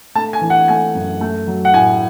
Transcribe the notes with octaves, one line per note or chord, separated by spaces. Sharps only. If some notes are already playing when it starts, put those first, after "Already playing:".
A3 A5
G#5
E3
F#5
A3 G#5
F#2
A3
F#3
F#5
A2 G#5